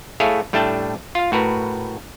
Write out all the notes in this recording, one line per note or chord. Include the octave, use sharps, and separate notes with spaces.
A3 E4 G#4 A4 C#5 F5
A2 G3 A3 D4 G5 A5
F4 F5
A2 F#4 A#4 B4